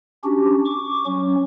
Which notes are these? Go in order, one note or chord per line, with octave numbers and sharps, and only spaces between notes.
C#4 D4 F#4 G4
C#6 D6
F#3 C#4